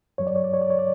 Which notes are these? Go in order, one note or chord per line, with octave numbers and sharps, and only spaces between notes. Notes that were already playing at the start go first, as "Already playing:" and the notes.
G2 F#3 C#5
D5
C#5
D5
C#5
D5
C#5
D5